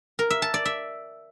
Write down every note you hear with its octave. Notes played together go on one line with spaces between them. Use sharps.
A#4
E5
A5
D5
E5